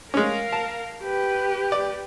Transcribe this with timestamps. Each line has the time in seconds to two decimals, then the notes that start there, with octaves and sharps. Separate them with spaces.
0.14 G#3 C#4 A#4 F5
0.52 A5
1.02 G4 B4
1.72 D5